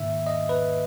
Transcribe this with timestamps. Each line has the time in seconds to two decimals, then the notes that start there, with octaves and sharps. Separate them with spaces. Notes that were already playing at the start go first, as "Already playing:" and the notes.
Already playing: G#2 D#3 A#3 D#4 E5
0.27 D#5
0.49 B4